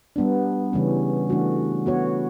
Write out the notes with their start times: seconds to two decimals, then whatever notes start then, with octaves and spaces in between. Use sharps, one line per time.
0.16 G3 B3 D4
0.73 C#3 E3 G3 C#4
1.30 E3 A3 D4 F#4
1.86 B3 F#4 C#5